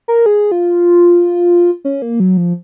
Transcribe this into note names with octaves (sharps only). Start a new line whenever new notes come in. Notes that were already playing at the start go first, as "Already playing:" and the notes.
A#4
G#4
F4
C#4
A#3
F#3
F3